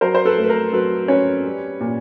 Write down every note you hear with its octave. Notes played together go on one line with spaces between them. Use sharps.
F#3 A#4 C5
C5
A4 B4
A3
B4
A#4
F#3 A4 B4
C#4 B4 C#5
G3
A#2